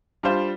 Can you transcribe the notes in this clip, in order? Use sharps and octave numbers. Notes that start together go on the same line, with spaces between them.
G3 D4 F4 C5